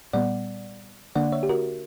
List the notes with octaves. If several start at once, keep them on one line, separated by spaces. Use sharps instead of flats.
A#2 G3 B3 D5 F#5
D3 A#3 D4 D5 F#5
C#5 E5
G4
F#4 A#4